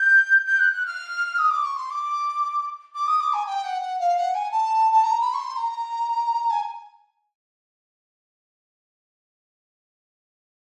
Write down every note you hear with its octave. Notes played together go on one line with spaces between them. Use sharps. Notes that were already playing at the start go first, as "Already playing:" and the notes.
Already playing: G6
G6
F#6
F#6
F6
D#6
D6
C#6
C6
D6
D6
D#6
D6
G#5
G5
F#5
F#5
F5
F#5
G#5
A5
A5
A#5
B5
C#6
C6
A#5
G#5